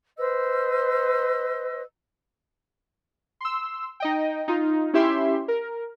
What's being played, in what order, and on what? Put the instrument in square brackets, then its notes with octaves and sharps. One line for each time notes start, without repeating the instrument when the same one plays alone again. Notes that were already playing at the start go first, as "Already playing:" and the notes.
[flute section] B4 C5 D#5 E6
[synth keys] C6 E6
D#4 D#5 G5
D#4 F4
C#4 E4 G4 E5 C6
A#4